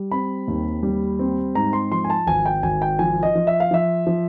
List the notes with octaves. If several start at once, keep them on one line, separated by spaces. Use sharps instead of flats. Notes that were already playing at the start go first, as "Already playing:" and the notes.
Already playing: G3
C4 B5
D#2
G3
C4
G#2 A#5
C6
F3 C6
G#5
A5
G#1 G#5
G5
G#1 G#5
G5
F3 G#5
D#5
F3
E5
F5
F3 E5
F3